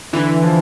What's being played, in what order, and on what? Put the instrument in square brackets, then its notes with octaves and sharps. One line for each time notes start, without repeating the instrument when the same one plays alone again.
[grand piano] D3 [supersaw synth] E3
[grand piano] F3